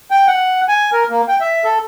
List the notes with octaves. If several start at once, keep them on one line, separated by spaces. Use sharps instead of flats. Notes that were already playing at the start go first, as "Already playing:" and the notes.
G5
F#5
G#5
A#4
A#3
G5
E5
A4